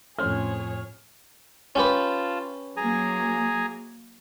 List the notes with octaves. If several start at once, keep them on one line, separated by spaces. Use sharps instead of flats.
F2 A2 A3 C#4 G#4 C5 C#5 F6
C#4 F4 G4 B4 A5
F#3 A#3 G#4 G#5 A#5